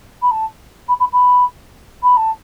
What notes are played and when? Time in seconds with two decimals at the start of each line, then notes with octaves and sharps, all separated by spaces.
0.22 B5
0.31 A5
0.88 B5
1.00 B5
1.12 B5
2.03 B5
2.17 A5